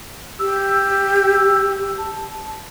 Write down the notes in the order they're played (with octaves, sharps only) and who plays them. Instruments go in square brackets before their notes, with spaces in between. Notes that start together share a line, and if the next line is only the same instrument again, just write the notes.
[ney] G4 [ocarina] E6
[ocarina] A5